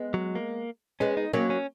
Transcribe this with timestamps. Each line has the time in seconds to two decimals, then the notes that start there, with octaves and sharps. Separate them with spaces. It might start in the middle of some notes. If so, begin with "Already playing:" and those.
Already playing: G#3 B3
0.14 F#3
0.35 A#3
1.00 G#3 B3 C#4
1.17 D#4
1.33 F#3 A#3 C#4
1.50 C#4